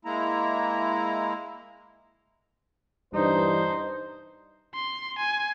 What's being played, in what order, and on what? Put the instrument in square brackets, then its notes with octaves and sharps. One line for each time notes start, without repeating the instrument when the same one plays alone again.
[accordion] G#3 A#3 E4 A#5
[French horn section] G2 E3 D4 [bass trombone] G3 [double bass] D#4 [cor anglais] C5
[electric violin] C6
G#5